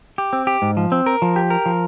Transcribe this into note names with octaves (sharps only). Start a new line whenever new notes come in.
G4
C4
G4
G#2
F3
C4
A#4
F3
G4
A#4
F3